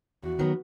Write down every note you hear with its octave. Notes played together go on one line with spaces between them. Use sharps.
E2 F#4
D#3 F#3 B3